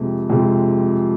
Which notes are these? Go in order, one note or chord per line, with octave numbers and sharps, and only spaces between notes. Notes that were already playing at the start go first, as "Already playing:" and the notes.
Already playing: F2 C3 G#3
F2 C3 G#3